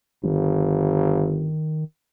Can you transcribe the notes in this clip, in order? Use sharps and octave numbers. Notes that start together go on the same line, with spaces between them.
G1 D#3